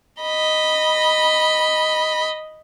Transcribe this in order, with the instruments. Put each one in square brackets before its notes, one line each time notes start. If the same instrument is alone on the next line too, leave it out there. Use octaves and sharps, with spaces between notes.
[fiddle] D#5 B5